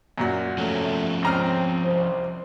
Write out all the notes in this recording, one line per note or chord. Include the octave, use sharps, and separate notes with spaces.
F#2 A#2 F#4
C3 F3 A3 C#4
C#2 C4 A#5 F6
C2 C5